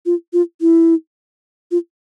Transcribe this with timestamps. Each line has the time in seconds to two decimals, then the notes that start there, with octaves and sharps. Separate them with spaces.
0.06 F4
0.33 F4
0.61 E4
1.71 F4